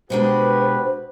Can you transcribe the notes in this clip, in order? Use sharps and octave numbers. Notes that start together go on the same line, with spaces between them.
B2 G#3 D4 F#4 G4 B4 C5